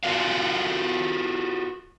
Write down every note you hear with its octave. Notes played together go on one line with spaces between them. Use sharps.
F4 F#4 A#4 F5